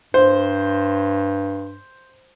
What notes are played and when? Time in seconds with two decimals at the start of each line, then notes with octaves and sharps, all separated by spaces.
0.14 G2 C5